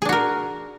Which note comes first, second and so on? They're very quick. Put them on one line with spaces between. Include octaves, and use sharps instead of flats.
G#4 D4 F#4 A#4